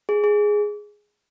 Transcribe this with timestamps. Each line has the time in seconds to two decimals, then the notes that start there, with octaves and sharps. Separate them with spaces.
0.09 G#4
0.24 G#4